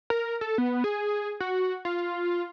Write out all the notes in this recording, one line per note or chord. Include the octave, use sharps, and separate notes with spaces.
A#4
A4
B3
G#4
F#4
F4